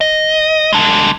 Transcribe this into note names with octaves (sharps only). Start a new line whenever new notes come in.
D#5
G#3 D4